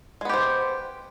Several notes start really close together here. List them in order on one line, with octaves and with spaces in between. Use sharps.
G#3 B3 G4 C5